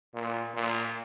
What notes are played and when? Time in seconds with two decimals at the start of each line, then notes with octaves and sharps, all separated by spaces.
0.14 A#2
0.54 A#2